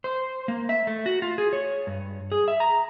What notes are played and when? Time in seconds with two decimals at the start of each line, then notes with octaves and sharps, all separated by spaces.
0.04 C5
0.48 A#3
0.69 E5
0.87 A3
1.06 F#4
1.22 F4
1.38 G#4
1.53 C#5
1.87 G2
2.32 G#4
2.48 E5
2.60 A#5